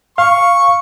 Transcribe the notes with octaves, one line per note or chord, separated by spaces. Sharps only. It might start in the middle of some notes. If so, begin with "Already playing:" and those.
F5 C#6